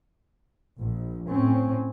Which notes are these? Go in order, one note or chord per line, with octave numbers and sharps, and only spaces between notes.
A#1
A2 C4 C#4